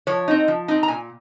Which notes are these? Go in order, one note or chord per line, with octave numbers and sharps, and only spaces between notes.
F3 C#5
C4 D#4
F3
C4 D#4
A#5
A#2 G#5